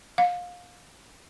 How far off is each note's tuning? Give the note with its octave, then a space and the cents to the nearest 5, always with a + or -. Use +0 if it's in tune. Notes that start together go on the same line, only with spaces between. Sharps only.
F5 +25